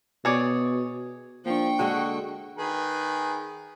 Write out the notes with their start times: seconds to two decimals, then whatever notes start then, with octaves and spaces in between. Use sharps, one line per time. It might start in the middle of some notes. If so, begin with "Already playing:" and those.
0.25 B2 G#4 C#5 D5
1.46 F3 A#3 D4 G5 C#6
1.79 D3 G#3 F#4
2.58 D#3 G#4 B4